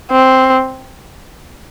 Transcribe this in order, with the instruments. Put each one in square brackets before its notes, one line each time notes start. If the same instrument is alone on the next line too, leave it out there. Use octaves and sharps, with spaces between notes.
[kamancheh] C4